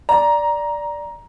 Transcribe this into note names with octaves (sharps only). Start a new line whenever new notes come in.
D5 A#5